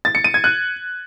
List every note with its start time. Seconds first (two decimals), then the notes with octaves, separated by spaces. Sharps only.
0.05 A6
0.15 C#7
0.24 D#7
0.34 G#6
0.44 F#6